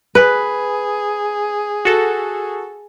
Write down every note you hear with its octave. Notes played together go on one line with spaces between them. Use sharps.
G#4 B4
F#4 A4